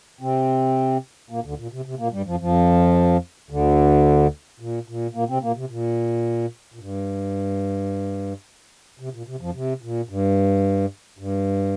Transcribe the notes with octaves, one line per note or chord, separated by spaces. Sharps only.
C3 C4
A#2 A#3
D2 D3
A#2
C3
C3
A#2 A#3
G2 G3
F2 F3
F2 F3
D2 D3
A#2
A#2
A#2 A#3
C3 C4
A#2 A#3
C3
A#2
A#2
G2
C3
A#2
C3
F2 F3
C3
A#2
G2
G2